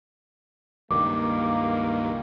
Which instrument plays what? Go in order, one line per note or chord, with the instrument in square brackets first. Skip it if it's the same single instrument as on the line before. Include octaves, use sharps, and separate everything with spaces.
[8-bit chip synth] C#2 G2 D#3 [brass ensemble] A#3 [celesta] D6